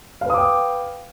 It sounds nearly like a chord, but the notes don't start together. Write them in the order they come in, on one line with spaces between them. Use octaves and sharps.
F5 B4 D#6 D6 G5